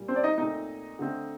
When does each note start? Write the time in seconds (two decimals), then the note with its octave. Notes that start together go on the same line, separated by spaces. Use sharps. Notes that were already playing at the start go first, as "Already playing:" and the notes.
Already playing: A#2 G3
0.08 C4 C5
0.16 D5
0.24 D#4 D#5
0.38 A#2 A3 C4 D#4 D#5
0.99 D3 A3 C4